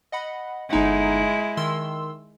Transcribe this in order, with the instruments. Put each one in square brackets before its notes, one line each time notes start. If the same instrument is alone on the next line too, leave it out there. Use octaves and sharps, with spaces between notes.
[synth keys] D#5 F#5 B5
[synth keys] G1 D#4 F#5 [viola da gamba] G#3 E4
[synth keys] D#3 C6 E6